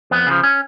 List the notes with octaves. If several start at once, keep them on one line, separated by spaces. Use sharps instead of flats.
F2 B3
C#3 F3
C#4